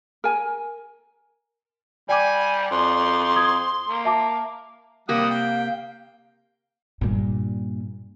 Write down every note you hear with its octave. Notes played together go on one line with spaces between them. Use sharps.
A#4 G#5
G3 D5 G5 G#5 D6
F2 C6
D#6 G#6
A#3
E5 A5 D6
C3 G3 A#3 G4 F5 F#5 D#6
G5
G2 A#2